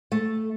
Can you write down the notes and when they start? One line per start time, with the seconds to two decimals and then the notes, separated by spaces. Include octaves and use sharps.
0.12 A3